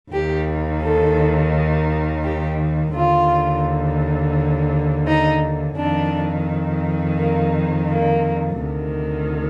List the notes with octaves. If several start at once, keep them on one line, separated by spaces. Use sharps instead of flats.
D#2 D#3 G4
A4
G4
D#2 D3 F4
D#4
F2 D#3 D4
A#3
A#3
D2 C3 D#3